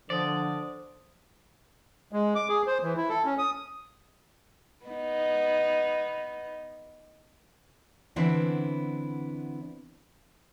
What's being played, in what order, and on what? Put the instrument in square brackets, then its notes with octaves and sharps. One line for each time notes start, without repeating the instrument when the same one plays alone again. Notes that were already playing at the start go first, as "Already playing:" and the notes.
[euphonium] D3 [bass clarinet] F3 [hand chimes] C5 D#6 [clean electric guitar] D5
[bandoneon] G#3
D6
G#4
C5
E3
E4
A4
C#4
D#6
[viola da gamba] B3 D#4
[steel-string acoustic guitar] D3 E3 B3 C4 D4 E4